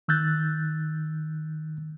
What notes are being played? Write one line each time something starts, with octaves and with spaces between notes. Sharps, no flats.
D#3 E6 F#6 G6 A6